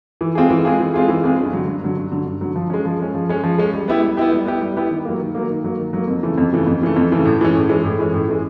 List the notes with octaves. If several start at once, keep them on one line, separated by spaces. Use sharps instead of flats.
E3
G#3 C4 F4 G#4
E3
G#3 C4 F4 G#4
E3
G#3 C4 F4 G#4
E3
G#3 C4 F4 G#4
G2
D3 F#3
G2
D3 F#3
G2
D3 F#3
G2
D3 F#3
F3
G#3 C#4
F3
G#3 C#4
F3
G#3 C#4
F3
G#3 C#4
G3
B3 E4 G4
G3
B3 E4 G4
G3
B3 E4 G4
G3
B3 E4 G4
D#3
F#3 A#3
D#3
F#3 A#3
D#3
F#3 A#3
D#3
F#3 A#3
F2
C#3 E3 A3
F2
C#3 E3 A3
F2
C#3 E3 A3
F2
C#3 E3 A3
A2
E3 G#3 C#4
A2
E3 G#3 C#4
A2
E3 G#3 C#4
A2
E3 G#3 C#4